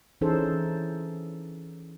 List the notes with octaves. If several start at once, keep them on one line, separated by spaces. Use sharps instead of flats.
E3 C#4 D#4 G#4 A4 C5